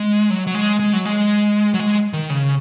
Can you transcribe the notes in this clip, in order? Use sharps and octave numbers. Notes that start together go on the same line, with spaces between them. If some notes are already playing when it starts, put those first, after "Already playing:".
Already playing: G#3
F#3
F#3
G#3
G#3
F#3
G#3
F#3
G#3
D#3
C#3